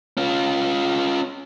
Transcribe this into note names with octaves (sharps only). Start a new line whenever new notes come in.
C#4 F4